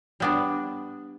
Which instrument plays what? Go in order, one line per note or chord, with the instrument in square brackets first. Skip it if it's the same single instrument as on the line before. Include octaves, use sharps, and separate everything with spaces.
[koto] G3 B3 D4